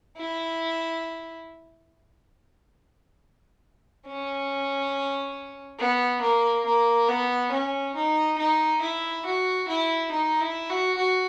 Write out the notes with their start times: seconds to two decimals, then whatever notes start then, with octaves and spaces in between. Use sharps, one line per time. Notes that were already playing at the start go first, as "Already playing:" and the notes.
0.17 E4
4.07 C#4
5.79 B3
6.22 A#3
6.66 A#3
7.08 B3
7.52 C#4
7.95 D#4
8.38 D#4
8.81 E4
9.25 F#4
9.68 E4
10.12 D#4
10.41 E4
10.70 F#4
10.97 F#4